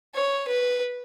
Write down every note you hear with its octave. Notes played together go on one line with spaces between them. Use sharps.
C#5
B4